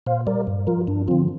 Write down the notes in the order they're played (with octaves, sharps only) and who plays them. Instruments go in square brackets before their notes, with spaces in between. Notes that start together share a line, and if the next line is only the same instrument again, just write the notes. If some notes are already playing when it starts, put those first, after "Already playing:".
[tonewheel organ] A#2 C5 F5
G3 A#4 D5
G2
F3 F4 A#4
G2 D4
D3 F3 C4 F4